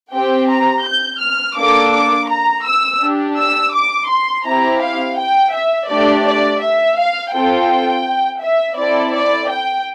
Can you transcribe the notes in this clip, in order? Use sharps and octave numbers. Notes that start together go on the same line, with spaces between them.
C4 G4 G5
A#5
G6
F6
A#3 D4 A4 D6
D6
A#5
E6
D4 G4
E6
D6
C6
C4 E4 G4 A#5
F5
G5
E5
A3 D4 G4 D5
D5
E5
F5
C4 F4 A4 G5
E5
C4 E4 A4 D5
D5
G5